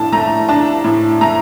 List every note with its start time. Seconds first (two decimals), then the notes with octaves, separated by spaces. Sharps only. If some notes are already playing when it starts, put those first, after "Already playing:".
Already playing: A2 D4 A5
0.13 A3 A#5
0.49 D4 A5
0.84 A2
1.21 A3 A#5